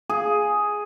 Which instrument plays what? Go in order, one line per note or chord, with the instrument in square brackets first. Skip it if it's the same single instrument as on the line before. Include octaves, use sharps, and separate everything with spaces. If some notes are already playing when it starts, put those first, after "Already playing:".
[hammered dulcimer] G#4